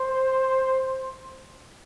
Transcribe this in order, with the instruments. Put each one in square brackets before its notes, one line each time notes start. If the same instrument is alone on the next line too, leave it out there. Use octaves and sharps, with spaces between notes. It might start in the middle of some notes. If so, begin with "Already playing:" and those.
Already playing: [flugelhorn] C5